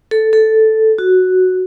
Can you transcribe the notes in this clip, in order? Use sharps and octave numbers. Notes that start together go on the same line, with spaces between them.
A4
A4
F#4